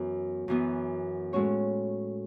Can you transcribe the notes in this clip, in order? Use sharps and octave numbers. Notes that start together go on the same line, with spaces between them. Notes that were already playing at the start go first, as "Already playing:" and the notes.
Already playing: F#2 E3 B3
F#2 E3 B3
A2 G#3 C#4 F#4 C#5